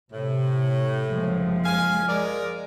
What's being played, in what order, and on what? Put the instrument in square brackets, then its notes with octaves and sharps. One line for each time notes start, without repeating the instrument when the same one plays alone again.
[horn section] A2 [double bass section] C3
[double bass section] F#1 G#3 [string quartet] F3
[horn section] F5 G#5
G#3 A#4 D5